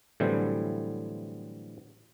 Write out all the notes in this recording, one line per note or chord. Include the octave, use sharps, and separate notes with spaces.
A2 D3 E3 F#3 G3 C4